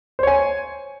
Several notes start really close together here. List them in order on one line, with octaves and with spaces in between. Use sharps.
C5 C#5 G#5